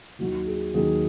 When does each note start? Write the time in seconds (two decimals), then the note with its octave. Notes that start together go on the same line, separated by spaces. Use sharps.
0.19 D#2 D#3 F#3 F#4
0.46 G#4
0.74 D#2 D#3 F#3 G#4